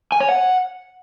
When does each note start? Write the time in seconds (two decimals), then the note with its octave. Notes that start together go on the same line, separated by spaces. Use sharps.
0.12 G#5
0.20 C#5
0.29 F#5